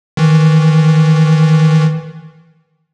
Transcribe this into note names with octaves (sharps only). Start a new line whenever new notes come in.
D#3 E3